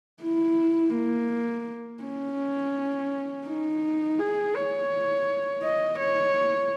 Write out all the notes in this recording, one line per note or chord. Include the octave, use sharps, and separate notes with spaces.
E4
A#3
C#4
D#4
G#4
C#5
D#5
C#5